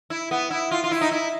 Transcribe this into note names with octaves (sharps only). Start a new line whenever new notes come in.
E4
B3
E4
F4
F4
E4
D#4
E4